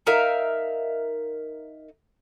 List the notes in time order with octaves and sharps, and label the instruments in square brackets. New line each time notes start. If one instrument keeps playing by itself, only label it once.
[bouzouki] D#4 A#4 E5 F5